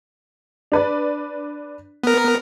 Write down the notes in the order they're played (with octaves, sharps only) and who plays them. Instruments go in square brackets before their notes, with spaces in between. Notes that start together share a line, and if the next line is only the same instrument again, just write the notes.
[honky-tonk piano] D4 B4 D5
[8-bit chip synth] B3 A#4